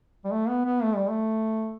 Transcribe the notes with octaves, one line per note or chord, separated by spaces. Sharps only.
G3
A3
B3
B3
A3
G3
A3